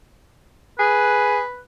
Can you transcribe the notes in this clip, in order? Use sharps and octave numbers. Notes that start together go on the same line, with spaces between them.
G#4 B4